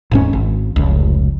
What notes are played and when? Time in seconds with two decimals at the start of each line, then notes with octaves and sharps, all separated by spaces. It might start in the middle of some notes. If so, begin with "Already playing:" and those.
0.11 D#1 G#2 C#4
0.33 G#1
0.76 F1 C#2